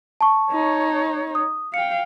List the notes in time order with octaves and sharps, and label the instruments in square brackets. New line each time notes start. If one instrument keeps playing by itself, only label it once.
[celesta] A5 C#6
[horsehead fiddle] D#4 C#5
[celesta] D#6
[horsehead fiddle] F5 G5 [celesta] C#7